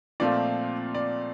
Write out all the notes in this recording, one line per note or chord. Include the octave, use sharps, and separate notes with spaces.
A#2 F3 A3 C4 F4 D5
D5